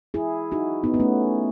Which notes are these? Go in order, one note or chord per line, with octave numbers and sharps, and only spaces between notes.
E4 G#4
D#4 F#4
B3 D#4
B3
A3 C#4